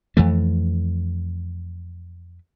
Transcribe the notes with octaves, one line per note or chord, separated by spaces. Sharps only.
F2 E3 A3